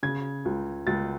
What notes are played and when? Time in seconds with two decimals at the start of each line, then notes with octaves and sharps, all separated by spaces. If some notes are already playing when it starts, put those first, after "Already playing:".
0.03 C#3 G#6
0.45 C#2
0.87 C#2 A6